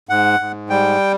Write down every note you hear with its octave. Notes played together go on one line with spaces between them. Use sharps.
G#2 F#5
G#2
G3 G5